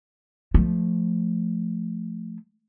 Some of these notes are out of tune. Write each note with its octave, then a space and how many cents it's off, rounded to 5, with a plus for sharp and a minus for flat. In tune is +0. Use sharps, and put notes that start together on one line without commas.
F3 +0 A3 +0